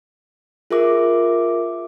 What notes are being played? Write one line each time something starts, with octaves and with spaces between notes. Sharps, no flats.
F4 G#4 A#4 E5 D6